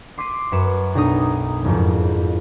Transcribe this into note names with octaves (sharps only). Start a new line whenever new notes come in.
C6 D6 B6 C7 D#7
F#2 B4 C#7 E7
B1 D4 D#4 A#5 D#6
F#1 F2 G#2